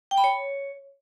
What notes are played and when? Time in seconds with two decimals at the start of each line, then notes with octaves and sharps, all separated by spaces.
0.11 G5
0.18 B5
0.24 C#5